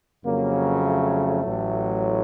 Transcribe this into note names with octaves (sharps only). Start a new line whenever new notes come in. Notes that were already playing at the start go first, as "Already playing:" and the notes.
F2 C#3 F#3 A#3
A3
A1 A2 F#3